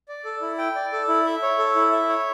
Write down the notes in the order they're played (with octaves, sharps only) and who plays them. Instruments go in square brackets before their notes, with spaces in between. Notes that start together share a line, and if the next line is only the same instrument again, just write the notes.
[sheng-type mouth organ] D5
A4
E4
G5
D5
A4
E4
E5
C#5
A4
E4
E5
C#5